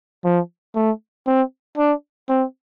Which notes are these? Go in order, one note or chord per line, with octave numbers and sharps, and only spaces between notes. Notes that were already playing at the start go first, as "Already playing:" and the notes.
F3
A3
C4
D4
C4